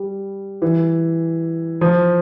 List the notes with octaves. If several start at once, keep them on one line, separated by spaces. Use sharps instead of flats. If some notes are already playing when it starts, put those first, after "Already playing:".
Already playing: G3
E3
F3